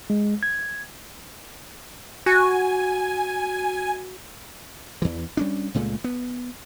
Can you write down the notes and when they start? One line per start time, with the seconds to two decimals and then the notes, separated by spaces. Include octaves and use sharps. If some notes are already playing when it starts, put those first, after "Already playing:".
0.10 G#3
0.43 G#6
2.26 F#4 G#5
5.02 E2 E3
5.37 G3 C#4 D4
5.74 C#2 A#2 G#3 A3
6.04 B3